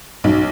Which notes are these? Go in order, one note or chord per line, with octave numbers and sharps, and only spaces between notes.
B1